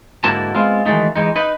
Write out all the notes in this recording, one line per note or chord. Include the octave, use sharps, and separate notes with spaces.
G#2 D3 A#3 E4 F#4 A5
G#3 B3 C4 F4
D#3 E3 F#3 G#3 A3 D#4
E3 G#3 D#4
D#4 B4